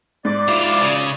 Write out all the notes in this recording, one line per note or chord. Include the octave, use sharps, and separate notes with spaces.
G#2 D5
E4 F4
C#3